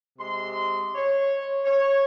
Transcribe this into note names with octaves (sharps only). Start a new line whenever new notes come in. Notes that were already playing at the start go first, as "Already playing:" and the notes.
C3 G#3 C6
C#5
C#5